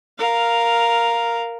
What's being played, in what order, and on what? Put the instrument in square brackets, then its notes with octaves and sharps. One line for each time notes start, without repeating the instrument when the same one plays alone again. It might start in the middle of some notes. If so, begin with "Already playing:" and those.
[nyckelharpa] A#4 F5